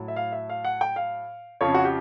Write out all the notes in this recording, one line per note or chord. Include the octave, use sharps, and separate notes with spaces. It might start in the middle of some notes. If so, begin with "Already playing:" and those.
Already playing: A2 F#3
E5
F5
E5
F5
F#5
G5
F5
F2 C#3 F3 C#5
F#4
G4